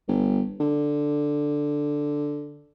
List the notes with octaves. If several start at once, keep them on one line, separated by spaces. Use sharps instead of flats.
G1
D3